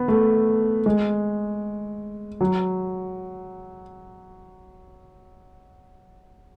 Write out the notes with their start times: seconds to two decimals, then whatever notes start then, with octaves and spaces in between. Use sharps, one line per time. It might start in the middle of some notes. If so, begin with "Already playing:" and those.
Already playing: B3
0.08 A3
0.86 G#3
2.41 F#3